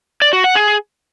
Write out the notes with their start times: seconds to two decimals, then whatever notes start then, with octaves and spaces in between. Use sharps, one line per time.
0.22 D5
0.33 F#4
0.44 F#5
0.55 G#4